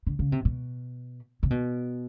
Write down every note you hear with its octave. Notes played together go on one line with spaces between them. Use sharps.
D3
C#3
C3
B2
C3
B2